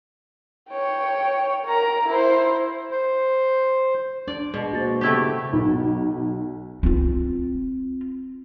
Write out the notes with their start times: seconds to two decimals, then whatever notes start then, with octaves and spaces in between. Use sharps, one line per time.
0.70 C#5 G5
1.65 A#4 A#5
2.08 E4 C5
2.91 C5
4.28 D4 D5
4.54 B2 G#3 G#4
4.73 A#3 F#4 C5 A6
5.01 C#3 A3 B3 E4 G4
5.53 B1
6.83 C4 F4